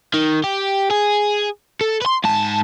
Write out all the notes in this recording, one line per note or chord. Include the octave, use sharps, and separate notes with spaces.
D#3
G4
G#4
A4
B4 C6
G#2 A5